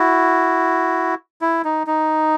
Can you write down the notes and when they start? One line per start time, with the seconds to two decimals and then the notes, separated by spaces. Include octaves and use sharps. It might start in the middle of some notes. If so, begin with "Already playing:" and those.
Already playing: E4 F#4
1.41 E4
1.65 D#4
1.87 D#4